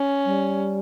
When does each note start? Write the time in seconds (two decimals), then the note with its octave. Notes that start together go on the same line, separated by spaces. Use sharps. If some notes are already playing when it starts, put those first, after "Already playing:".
Already playing: C#4
0.25 G3